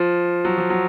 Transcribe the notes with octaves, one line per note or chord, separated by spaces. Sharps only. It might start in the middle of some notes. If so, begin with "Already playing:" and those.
Already playing: F3
F#3
F3
F#3